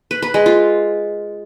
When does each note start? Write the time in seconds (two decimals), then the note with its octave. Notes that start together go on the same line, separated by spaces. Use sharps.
0.11 B4
0.22 B4
0.34 G#3
0.46 F4